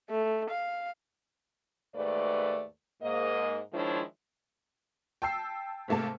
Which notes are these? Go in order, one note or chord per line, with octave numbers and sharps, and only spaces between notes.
A3
F5
D#2 G#2 A3 B4 D5
G#2 A#3 D#5
D#3 F3 G#3 D4 E4 C#5
G5 A5 E6 C7
G#2 C3 A3 A#3 A5